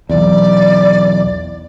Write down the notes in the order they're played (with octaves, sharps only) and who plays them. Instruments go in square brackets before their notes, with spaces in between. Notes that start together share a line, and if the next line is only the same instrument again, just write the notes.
[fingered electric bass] B1 E2 [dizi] D5